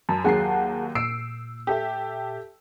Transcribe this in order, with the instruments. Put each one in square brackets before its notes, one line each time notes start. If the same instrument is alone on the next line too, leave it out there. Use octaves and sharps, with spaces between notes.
[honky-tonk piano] F#2 [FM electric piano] A5
[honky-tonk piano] D#2 F#3 C7 [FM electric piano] G#4 F#5 A5
[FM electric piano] A#2 [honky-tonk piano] E6 C7 D7
[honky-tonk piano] G4 A4 E5